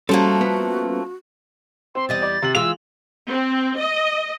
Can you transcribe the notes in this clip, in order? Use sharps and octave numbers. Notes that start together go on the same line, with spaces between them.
F3 G3 A3 A#3 C#4 F#4 A4 C5
B3
C4 C6
E2 G3 D#5 A6
D5
C3 F#7
E3 G#3 F4 E6 F7
C4
D#5